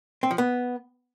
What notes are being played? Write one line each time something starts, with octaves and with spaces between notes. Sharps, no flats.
C4
F3
B3